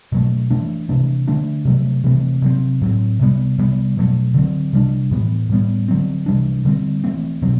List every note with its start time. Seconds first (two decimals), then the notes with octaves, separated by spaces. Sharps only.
0.12 B2 F#3 A3
0.50 E3 A3 D4
0.89 C3 E3 A3 D4
1.28 D3 A3 D4
1.65 C3 F#3 A3
2.04 C3 E3 A3 C4
2.42 C3 F#3 C4
2.82 A2 F#3 C4
3.19 C3 G3 B3
3.58 C3 G3 B3
3.97 B2 F#3 A3
4.34 D3 F#3 C4
4.73 C3 G3 D4
5.11 A2 E3 B3
5.49 A2 G3 B3
5.88 D3 F#3 C4
6.26 C3 E3 G3 D4
6.65 D3 G3 C4
7.04 E3 A3 C4
7.42 B2 F#3 C4